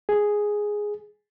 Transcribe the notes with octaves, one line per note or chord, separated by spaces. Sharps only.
G#4